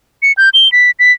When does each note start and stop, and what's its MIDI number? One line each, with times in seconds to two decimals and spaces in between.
0.22 0.32 97
0.37 0.49 91
0.54 0.71 103
0.72 0.91 95
0.99 1.12 95